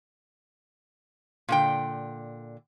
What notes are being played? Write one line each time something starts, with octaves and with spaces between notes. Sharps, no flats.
A#2 D3 G5